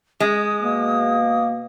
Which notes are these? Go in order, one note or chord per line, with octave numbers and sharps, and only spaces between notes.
G#3 D#6
B2 A#3